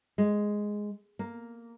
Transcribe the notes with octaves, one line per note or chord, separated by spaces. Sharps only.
G#3
A#3